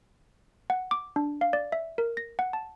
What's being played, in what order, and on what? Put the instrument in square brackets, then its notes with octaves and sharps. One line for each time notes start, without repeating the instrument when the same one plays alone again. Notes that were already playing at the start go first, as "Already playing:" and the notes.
[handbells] F#5
D6
D4
F5
D5
E5
A#4
A#6
F#5
A5